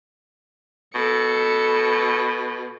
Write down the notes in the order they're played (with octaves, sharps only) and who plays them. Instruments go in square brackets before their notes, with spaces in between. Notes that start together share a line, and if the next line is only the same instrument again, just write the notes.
[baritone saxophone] B2 [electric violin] A4 C#7